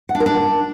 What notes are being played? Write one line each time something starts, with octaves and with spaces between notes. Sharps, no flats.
F#5
D4
A#4
D4